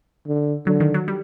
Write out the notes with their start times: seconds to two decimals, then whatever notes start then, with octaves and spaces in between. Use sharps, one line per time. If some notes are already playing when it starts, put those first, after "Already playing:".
0.27 D3
0.67 D3 F#3
0.80 D#3
0.94 F#3
1.08 G3